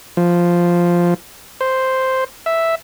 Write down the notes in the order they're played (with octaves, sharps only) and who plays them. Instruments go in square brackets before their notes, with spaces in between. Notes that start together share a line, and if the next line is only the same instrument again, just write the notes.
[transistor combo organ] F3
C5
E5